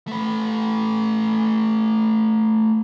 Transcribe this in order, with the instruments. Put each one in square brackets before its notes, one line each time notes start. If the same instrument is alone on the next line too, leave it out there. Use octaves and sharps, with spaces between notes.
[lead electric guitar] A3 B4